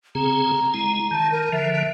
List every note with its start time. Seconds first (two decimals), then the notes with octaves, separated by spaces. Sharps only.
0.15 C#3 C4 G#4 A#5
0.74 G#3 E4
1.11 D#3 A5
1.32 A#4
1.52 D3 F3 E5